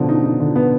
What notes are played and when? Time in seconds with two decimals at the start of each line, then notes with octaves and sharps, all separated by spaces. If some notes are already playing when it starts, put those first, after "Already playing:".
Already playing: B2 D3 F3
0.09 D#4
0.24 D#4
0.40 D3
0.56 B3